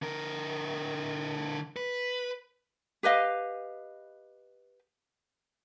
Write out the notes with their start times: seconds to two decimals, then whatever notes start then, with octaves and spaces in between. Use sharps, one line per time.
0.02 D3 A#4
1.76 B4
3.03 G4 B4 D#5 F5